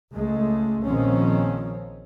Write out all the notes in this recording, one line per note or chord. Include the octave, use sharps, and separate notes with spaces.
C#2 G#3 A3
A#1 D#3 F3 C4 C#4